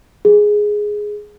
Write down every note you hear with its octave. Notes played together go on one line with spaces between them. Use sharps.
G#4